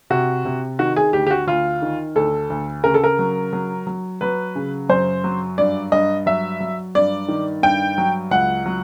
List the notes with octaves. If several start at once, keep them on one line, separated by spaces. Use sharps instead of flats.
C3 F#4
C3
D#3 F#4
G#4
D2 G4
G4
F#4
D2 F4
D#3
D2 A4
D2
C#3 A#4
A4
A#4
F#3
F#3
F#3
F#3 B4
C#3
F#2 C5
F#3
G2 D5
G2 D#5
F#3 E5
F#3
G2 D5
D#3
G2 G5
F#3
C#2 F#5
F#3